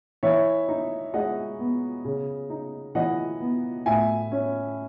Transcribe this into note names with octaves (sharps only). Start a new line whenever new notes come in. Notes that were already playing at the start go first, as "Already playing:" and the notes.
E3 C#5 E5
D#4
G#3 D#5 F#5
B3
C#3
D#4
E3 D#5 F#5
B3
A2 E5 G#5
C#4